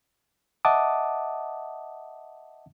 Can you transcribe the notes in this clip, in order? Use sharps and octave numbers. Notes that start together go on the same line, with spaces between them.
D#5 E5 F#5 A5 D6 D#6